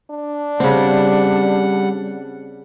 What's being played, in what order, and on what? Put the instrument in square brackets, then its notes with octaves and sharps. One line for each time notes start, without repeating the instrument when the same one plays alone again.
[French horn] D4
[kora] C#3 C4 [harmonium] G3 F#5